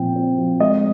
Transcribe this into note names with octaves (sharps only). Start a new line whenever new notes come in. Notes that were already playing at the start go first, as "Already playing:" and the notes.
Already playing: A#2 F3 C4 G5
C4
F3
G#3 D#5